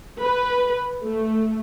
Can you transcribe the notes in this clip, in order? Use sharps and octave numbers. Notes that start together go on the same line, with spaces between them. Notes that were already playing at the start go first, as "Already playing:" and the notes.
B4
A3